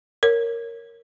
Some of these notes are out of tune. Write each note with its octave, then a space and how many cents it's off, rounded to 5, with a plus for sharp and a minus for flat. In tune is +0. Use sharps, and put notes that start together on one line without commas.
A#4 -5 C#5 +0